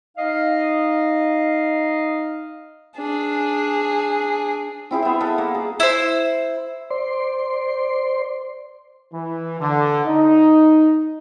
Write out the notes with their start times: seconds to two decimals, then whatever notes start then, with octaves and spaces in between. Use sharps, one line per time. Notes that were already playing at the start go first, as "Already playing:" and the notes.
0.18 D#4 D#5 F5
2.97 D4 G#4
4.91 C4 E4 G#4 C5
5.02 B3 E5
5.20 A4 D#5 F5
5.38 A#3 F5
5.55 G#4
5.80 E4 C5
6.90 C5 D5 C6
9.13 E3
9.61 D3
10.06 D#4